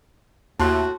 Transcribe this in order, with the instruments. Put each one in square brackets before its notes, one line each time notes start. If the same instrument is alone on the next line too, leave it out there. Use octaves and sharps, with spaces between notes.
[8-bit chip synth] D#2 [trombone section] A2 [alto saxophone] F#4 [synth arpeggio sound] A5 C6 F#6